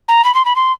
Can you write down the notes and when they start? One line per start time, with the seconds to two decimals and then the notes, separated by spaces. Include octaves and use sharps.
0.08 A#5
0.24 B5
0.34 C6
0.45 B5
0.56 C6